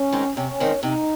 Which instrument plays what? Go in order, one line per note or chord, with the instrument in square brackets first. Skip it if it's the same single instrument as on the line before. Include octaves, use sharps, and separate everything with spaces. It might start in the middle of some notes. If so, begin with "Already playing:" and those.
Already playing: [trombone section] C#4
[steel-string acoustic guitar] D#3 G#3 C4
[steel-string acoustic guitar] C3 [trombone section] C#4
[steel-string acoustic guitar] D#3 G#3 C4
[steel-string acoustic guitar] C3 [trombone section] D#4